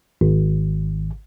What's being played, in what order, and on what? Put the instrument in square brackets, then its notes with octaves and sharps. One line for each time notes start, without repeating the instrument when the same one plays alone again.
[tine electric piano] G#1